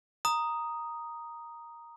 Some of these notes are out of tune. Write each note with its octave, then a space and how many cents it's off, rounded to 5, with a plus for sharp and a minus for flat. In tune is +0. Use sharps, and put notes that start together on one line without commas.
A#5 +0 D#6 +0